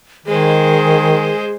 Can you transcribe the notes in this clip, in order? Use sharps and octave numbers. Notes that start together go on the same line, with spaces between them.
D#3 G#3 G#4 C5